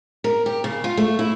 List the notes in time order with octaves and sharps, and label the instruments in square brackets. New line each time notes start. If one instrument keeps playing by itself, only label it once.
[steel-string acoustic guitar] A#4
G4
C#3
F4
A3
E4